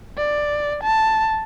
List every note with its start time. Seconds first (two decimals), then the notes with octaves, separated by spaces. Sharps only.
0.18 D5
0.83 A5